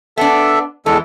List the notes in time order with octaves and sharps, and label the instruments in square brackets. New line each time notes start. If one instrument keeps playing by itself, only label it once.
[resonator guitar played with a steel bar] B3 D4 [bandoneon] A4 E5
[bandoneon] E2 G#3 A4 [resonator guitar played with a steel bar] E3